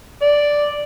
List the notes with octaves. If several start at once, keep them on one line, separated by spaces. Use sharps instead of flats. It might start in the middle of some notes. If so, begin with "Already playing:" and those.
D5